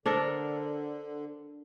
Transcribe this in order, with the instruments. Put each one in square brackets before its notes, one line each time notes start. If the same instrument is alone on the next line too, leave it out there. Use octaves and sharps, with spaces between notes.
[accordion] D3 [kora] D4 A4 A#4 [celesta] C5